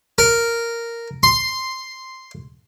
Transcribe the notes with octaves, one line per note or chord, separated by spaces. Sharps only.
A#4
C6